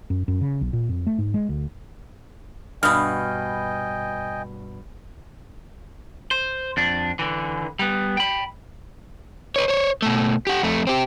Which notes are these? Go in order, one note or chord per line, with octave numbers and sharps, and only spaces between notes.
F#2
F#2
C#3
B1
A#2
F2
A3
G#2
G#3
D2
G2 B2 D#5 G5 G#5 D#6 F6
C5
F2 D4
D3 E3
G3 B3
G5 B5
B4 C#5
C5 C#5
B2 A3
G4 F#5
F2 A3
C4 G4